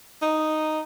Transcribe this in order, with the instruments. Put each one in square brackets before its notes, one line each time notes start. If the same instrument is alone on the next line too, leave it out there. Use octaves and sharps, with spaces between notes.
[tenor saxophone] D#4